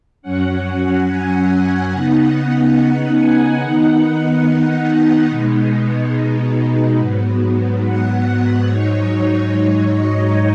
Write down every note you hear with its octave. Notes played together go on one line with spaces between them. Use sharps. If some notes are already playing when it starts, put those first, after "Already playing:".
F#2 F#3 C#4 F#5
F#5
G#5
F#5
C#3 B3 D#4
F#5
G#5
D#3 B3 D#4 F#5
F#5
B2 G#3 B3 D#4
G#2 F#3 B3
F#5
F#5
G#2 F#3 D#4 C#5
C#5
D#5